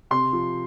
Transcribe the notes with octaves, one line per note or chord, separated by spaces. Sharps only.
C3 C6
F3